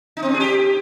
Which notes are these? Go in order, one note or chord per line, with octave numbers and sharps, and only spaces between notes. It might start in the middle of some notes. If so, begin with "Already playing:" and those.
D#4
C4
D4
G#4
G4